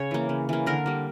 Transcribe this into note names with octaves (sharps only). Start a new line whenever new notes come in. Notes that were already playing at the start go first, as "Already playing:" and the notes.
Already playing: C#3 C#5
E3 A#3
C#3
E3 A#3
D3 A#4
G3 A#3